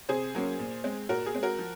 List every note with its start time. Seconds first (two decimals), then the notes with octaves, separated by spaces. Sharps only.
0.09 C3 G#4 C5
0.35 F#3 A#3 C#4
0.59 A#2
0.84 G#3 C4
1.09 A#2 F#4 A#4
1.26 G#4
1.34 G#3 C4
1.43 F#4 A#4
1.59 F3